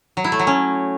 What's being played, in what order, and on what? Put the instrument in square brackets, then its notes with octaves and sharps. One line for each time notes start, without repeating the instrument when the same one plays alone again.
[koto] F#3
E4
A3
F#3
C#4